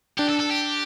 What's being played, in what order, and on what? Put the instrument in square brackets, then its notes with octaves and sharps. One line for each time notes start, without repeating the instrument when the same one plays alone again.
[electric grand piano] D4 [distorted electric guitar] G4
[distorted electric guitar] A4
A4
G4